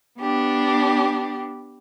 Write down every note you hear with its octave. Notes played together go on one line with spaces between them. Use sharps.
B3 D4 G4